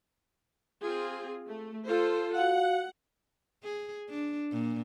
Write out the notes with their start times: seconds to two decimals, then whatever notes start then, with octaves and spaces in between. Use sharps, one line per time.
0.81 C4 F4 G#4
1.47 A3
1.86 F4 A4 C5
2.35 F#4 F5 F#5
3.64 G#4
4.10 D4
4.52 A#2